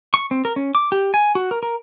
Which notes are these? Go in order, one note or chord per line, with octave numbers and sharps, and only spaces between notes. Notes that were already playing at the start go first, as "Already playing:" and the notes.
C#6
C4
A#4
C#4
D6
G4
G#5
F#4
A#4
A#4